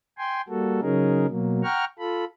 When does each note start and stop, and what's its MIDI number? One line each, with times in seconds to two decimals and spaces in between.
0.18 0.41 79
0.18 0.41 80
0.18 0.41 84
0.48 0.80 55
0.48 0.80 58
0.48 0.80 66
0.48 0.80 69
0.81 1.26 49
0.81 1.26 54
0.81 1.26 61
0.81 1.26 63
0.81 1.26 68
0.81 1.26 70
1.28 1.62 47
1.28 1.62 54
1.28 1.62 58
1.63 1.85 78
1.63 1.85 79
1.63 1.85 82
1.63 1.85 85
1.63 1.85 89
1.99 2.24 65
1.99 2.24 69
1.99 2.24 83